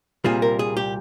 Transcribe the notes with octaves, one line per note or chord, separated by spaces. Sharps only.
C2 A#2 G3 C4 F4 G#4
A#4
G#4
G4